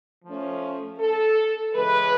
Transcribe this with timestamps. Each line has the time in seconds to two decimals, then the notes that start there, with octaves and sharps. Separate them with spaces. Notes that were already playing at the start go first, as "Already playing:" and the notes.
0.25 F3 A3 C#4
1.00 A4
1.75 C#3 E3 G#3 B4